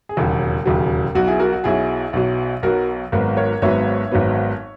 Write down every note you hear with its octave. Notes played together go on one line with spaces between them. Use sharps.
G#4
E1 D#2 C#3 F#3 F#4
E1 D#2 C#3 F#3
B1 B2 F#3 F#4
E4 G#4
F#4 A#4
F#4
B1 B2 F#3 E4 G#4
B1 B2 F#3
B1 B2 F#3 F#4 A#4
G#1 G#2 F#3 B3 F#4 A#4
A#4 C#5
G#1 G#2 F#3 B3 C#5 E5
G#1 G#2 F#3 B3